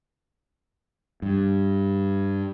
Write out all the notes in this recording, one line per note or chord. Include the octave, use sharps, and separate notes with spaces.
G2